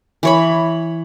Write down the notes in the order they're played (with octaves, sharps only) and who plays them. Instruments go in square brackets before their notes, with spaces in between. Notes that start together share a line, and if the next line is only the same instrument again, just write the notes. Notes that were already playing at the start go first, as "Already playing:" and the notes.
[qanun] E3 C#5 B5